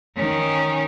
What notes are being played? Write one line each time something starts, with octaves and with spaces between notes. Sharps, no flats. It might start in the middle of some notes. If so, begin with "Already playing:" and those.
D#3 C#4